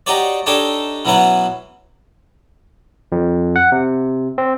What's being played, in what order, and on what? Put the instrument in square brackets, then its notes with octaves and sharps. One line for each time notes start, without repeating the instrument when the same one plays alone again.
[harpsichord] D#4 F#4 G4 C#5 D5
D4 D#4 G4 A4 C#5 G5
B2 E3 F#3 B3 C#4 F#5
[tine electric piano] F2
F#5
C3
C4